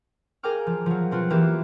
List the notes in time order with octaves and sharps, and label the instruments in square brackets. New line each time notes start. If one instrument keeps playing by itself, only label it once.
[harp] G#4 A#4 F5 G5 D6 F6
F3
F3 F#3
B2 C4 F4 F#4
E3 F3 A#3 B3 G4 E5